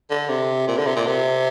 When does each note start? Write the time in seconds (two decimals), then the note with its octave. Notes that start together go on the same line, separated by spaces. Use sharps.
0.10 D3
0.29 C3
0.68 A#2
0.77 D3
0.86 C3
0.96 A#2
1.06 C3